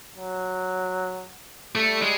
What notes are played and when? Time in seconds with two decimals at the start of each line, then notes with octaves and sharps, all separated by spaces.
0.15 F#3
1.75 G3 A3
2.02 G#3